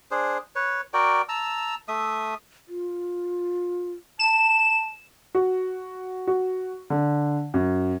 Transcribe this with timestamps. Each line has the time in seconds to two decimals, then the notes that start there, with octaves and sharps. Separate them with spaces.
0.11 D4 G#4 C5
0.55 B4 C#5
0.93 F#4 A#4 D5 G5
1.29 A5 A#5 E6
1.88 A3 E5 D#6
2.68 F4
4.19 A5 E7
5.35 F#4
6.27 F#4
6.90 D3
7.54 F#2